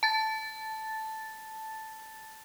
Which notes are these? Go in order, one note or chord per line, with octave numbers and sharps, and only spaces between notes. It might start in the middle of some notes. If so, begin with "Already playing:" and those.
A5 A6